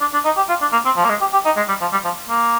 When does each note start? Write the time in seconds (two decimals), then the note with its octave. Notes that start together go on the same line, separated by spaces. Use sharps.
0.01 D4
0.13 D4
0.25 D#4
0.36 G4
0.49 F4
0.61 D4
0.72 A#3
0.85 C4
0.97 F3
1.05 A#3
1.09 G#3
1.21 G4
1.33 G4
1.45 D#4
1.57 G#3
1.68 G3
1.81 F3
1.92 G3
2.04 F3
2.29 A#3